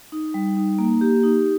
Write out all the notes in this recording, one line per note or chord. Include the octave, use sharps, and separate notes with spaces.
D#4
G3
D#4
A#3
G4
D#4